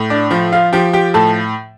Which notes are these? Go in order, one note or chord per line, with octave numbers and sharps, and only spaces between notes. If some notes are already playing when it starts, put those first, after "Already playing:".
Already playing: A2
D4 D5
F3
F4 F5
F3 G4 G5
G4 G5
A2 A4 A5